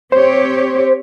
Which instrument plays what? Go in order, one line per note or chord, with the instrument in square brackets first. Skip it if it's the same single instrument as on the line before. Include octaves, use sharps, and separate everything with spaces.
[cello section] C4 G4 C#5 [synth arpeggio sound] C5